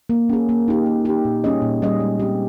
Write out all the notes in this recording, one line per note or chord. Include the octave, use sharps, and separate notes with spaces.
A#3
C#4 G#4
A#3
D#4 G4
A#3
D#4 G4
A#2
G3 C#4 G#4 D#5
A#2
G3 C#4 G#4 D#5
G#3
C4 G4